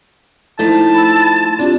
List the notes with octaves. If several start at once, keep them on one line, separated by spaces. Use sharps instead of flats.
F3 A3 D#4 E4 A5
B5 E6
C4 D4 F4 G4